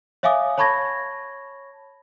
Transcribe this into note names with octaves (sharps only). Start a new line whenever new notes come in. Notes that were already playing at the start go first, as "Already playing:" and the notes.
C#5 E5 F5 G#5 D6 D#6
C#5 A5 B5 C#6 G#6 A#6